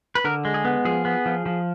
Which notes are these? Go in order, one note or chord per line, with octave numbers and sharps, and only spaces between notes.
B4
D3 A#4
G#3
G#4
B3
F3 G#4
B3
F3
F3